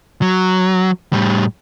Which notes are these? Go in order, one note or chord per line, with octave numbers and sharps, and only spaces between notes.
F#3
A2 G3